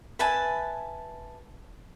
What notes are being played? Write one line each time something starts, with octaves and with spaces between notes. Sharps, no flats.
B4 E5 G#5 A5